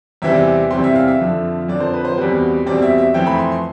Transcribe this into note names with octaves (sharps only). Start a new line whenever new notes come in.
E2 C3 E3 G3 C4 E5
E2 C3 E3 G3 C4 C6
E5
F5
E5
F2 D3 F3
F2 D3 F3 D5
C5
B4
C5
E2 B2 G3 C4 B4
E2 B2 G3 C4 D5
E5
E5
F2 E3 A3 C4 G5
B5
C6
C6